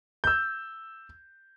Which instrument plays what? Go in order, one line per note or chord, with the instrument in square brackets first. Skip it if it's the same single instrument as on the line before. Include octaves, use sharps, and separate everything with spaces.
[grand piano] E6 G6